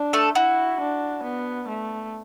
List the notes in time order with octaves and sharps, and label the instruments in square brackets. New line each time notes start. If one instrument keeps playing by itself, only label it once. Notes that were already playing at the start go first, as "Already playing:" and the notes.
Already playing: [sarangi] D4
[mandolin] A3 A4
[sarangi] E4 [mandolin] F#4
[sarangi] D4
B3
A3